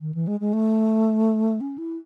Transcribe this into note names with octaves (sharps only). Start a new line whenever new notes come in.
D#3
E3
G#3
G#3
A3
C#4
E4